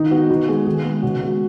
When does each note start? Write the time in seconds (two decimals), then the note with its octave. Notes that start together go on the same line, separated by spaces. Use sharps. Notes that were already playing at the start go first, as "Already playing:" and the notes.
Already playing: D#3 D#4
0.11 B3 F#4
0.30 D#3 F#4
0.48 G#3 B3 G#4
0.67 D#3 G#4
0.85 G#3 B3
1.02 C#3 F#4
1.21 G#3 B3 F#4